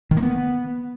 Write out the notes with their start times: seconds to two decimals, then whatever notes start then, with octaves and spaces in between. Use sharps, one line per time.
0.11 D#3
0.17 A#3
0.23 B3